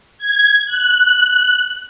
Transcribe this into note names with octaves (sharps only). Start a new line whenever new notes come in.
G#6
F#6